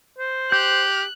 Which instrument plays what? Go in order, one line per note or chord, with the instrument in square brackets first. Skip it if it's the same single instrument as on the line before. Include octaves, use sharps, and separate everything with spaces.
[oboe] C5
[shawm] G4 [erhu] F#6 [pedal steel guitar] G6